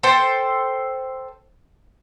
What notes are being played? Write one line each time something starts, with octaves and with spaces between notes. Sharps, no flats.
A4 C5 G5